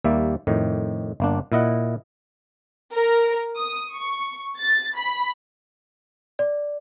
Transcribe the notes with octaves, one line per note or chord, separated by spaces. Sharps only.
D#2 G3 A#3 E5
F2 A2 D#3
G1 A#3 D4
A#2 E4 D#5 F#5
A#4
D#6
C#6
A6
B5
D5